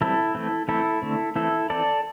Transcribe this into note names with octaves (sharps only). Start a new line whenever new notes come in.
E3 G3 C4 E4 A4
E3 A3 C4
E3 A3 C4 E4 A4
D3 A3 C4
E3 A3 C4 E4 A4
E3 C4 A4 D5